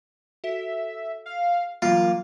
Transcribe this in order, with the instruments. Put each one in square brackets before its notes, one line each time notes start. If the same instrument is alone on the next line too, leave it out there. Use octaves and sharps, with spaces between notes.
[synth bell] F#4 A4 [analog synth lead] E5
[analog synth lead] F5
[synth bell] E3 F#3 G3 [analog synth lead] A#3 [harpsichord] F4